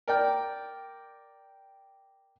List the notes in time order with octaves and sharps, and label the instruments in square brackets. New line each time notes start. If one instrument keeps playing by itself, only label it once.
[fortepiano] A#4 D5 G5